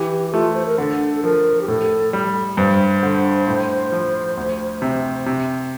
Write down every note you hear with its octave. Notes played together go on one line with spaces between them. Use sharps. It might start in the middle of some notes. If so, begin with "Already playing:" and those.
Already playing: E3 G4
G4
A3 F4
C5
A#4
D3 A4
A4
F3 A#4
G4
A2 A4
G3
G2 C5
D3
A2
F3
D2
C3
C3